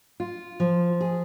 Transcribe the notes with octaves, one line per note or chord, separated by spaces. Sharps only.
F4
F3
G#4